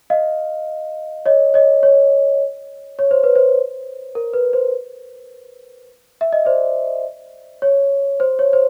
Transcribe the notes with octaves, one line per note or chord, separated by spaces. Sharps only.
D#5 F5
C#5 D#5
C#5 D#5
C#5
C#5
C5
B4
C5
A#4
B4
C5
E5
D#5
C5 D5
C#5
C5
C#5
C5